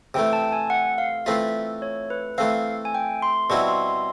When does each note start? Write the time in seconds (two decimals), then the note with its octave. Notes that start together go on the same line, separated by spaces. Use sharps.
0.14 C3 E3 A3 G5
0.33 A5
0.53 G#5
0.70 F#5
0.98 F5
1.26 E3 A3 C4 F4 E5
1.82 C#5
2.10 B4
2.38 E3 A3 C4 F5
2.85 G#5
2.95 G5
3.22 C6
3.50 B2 G3 C4 E4 C#6
3.68 C6
3.88 C6